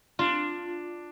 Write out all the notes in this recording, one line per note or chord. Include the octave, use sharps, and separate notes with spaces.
D4 F4